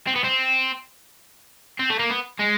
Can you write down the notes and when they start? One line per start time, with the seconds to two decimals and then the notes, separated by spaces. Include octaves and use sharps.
0.07 C4
0.16 B3
0.24 C4
1.80 C4
1.90 A3
1.99 A#3
2.10 B3
2.40 G#3